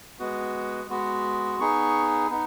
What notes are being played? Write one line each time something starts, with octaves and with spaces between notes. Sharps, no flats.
G#3 B3 F#4
G#3 B3 F#4
B3 D#4 G#4 C#6
B3 D#4